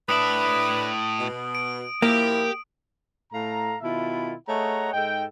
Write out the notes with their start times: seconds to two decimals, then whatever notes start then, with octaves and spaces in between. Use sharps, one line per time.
0.09 A2 D4 B4 E5 D#6 D7 F#7
1.20 B2
1.55 D7
2.02 A#2 F3 A#3 E4 G4
3.32 A2 A4 F5 A#5
3.81 B2 D#3 E4 F4 E5
4.48 A3 G#4 C#5 D#5 F#5 A#5
4.94 G#2 G#3 D#4 A4 G5